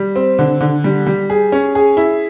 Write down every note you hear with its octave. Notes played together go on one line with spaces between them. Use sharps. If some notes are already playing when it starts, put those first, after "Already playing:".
Already playing: G3
C4
D3
D3
G3
G3
G#4
C#4
G#4
E4